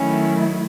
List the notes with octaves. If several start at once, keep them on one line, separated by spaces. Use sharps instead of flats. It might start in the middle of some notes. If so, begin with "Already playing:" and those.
Already playing: D#3 F#3 A3 C#4 E4